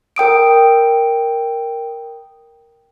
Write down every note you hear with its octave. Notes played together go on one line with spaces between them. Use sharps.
A#4 G5 D#6 D7